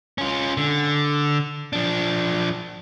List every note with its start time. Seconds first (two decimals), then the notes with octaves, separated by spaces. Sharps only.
0.18 C#4 F4
0.57 D3
1.73 F3 D4